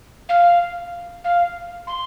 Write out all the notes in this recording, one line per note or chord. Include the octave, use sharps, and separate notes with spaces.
F5
F5
C6